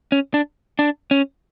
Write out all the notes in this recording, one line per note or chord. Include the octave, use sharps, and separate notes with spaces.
C#4
D4
D4
C#4